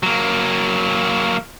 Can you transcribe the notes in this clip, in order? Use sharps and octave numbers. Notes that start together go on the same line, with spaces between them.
F#3 A#3